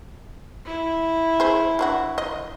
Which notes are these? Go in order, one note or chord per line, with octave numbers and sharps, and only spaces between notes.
E4
G#4 C5
F#3 D4 F#4
D#5